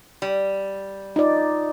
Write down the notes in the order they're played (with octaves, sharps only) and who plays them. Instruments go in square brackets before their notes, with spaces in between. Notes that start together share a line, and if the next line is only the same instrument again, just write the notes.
[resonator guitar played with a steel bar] G3
[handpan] D#4 F4 D5